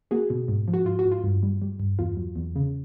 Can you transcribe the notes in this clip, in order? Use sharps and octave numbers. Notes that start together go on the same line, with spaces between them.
A#3 F#4 G#4
B2
G#2
F3
F#4
G#2 F4
F#4
G#2
F4
G2
G3
G3
G2
E2 F4
F#3
E2
C#3